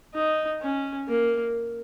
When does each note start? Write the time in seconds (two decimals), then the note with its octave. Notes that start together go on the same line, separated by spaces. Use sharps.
0.14 D#4
0.61 C#4
1.08 A#3